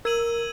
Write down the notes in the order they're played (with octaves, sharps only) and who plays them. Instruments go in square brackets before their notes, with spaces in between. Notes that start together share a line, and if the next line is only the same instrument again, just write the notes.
[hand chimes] A#4 [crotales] E6 G#6 D#7 F#7